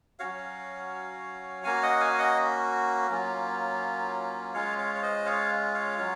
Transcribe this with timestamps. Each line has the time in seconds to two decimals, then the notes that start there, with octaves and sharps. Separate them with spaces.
0.19 F#3 C#4 F#4 C#5 F5
1.64 A#3 C#4 F#4 F5 G#5
1.83 D#5 F#5
2.00 F5 G#5
2.18 D#5 F#5
3.10 F#3 A#3 C#4 F4
4.54 G#3 C#4 F4 C#5 F5
4.78 C#5 F5
4.95 C#5
5.02 C5 D#5
5.26 C#5 F5
5.75 C#5 F5
5.98 F#3 C#4 F4